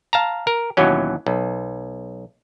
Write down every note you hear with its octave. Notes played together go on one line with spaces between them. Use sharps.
F5 A5 A#5
A#4
D#2 B2 E3 F#3 C#4
B1